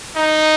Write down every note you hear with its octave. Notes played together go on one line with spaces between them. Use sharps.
D#4